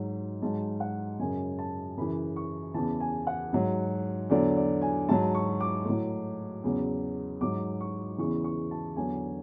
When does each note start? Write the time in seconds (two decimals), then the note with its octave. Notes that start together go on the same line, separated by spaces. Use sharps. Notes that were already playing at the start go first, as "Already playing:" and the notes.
Already playing: G#2 F#3
0.42 G#2 F#3 A5
0.80 F#5
1.20 F#2 C#3 F#3 G#5
1.59 A5
1.97 F#2 C#3 E3 B5
2.36 C#6
2.74 E2 C#3 E3 A5
3.00 G#5
3.27 F#5
3.53 G#2 F#3
4.30 E2 D3 F#3 D5
4.57 D5
4.82 G#5
5.08 G#2 F#3 A5
5.35 C#6
5.60 D6
5.85 A2 F#3
6.64 E2 C#3 F#3
7.41 G#2 F#3 D6
7.81 C#6
8.18 E2 C#3 E3 C#6
8.44 C#6
8.71 A5
8.96 E2 D3 F#3 G#5